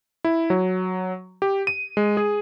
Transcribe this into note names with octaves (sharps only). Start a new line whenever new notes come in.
E4
F#3
G4
D#7
G#3
G#4